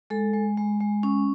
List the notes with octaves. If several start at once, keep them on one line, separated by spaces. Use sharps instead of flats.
G#3 A4
G#3
G#3
G#3
C#4